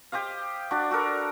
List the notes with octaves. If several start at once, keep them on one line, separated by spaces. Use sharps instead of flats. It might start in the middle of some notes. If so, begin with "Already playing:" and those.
G4 C5 D#5 F5
D4 F#4 D5
F#4 A4 A#4